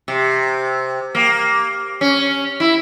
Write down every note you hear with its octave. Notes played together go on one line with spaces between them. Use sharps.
C3
A#3
C#4
E4